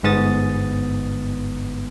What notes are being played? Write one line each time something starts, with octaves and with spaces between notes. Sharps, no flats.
G1 G#2 B3 D#6 A6